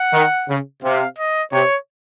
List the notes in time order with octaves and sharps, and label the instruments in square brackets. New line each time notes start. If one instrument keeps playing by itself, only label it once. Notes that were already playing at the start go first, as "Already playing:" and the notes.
Already playing: [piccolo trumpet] F#5
[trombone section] D#3
C#3
[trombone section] C3 [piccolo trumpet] F5
[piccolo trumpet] D#5
[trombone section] C3 [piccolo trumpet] C#5